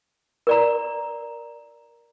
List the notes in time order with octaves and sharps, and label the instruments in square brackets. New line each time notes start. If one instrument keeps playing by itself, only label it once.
[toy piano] A#4 D5 A#5